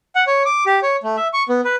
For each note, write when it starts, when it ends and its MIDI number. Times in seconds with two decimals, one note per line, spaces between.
0.16 0.24 78
0.27 0.43 73
0.45 0.64 86
0.66 0.80 67
0.83 0.96 73
1.03 1.17 57
1.17 1.28 76
1.33 1.43 85
1.49 1.61 59
1.65 1.76 71